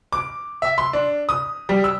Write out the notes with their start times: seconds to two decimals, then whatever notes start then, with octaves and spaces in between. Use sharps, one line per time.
0.12 D6
0.62 E5
0.78 C6
0.93 D4
1.29 D#6
1.69 G3
1.84 E6